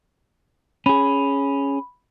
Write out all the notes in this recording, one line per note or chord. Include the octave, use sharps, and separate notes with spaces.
C#4 G#4 B5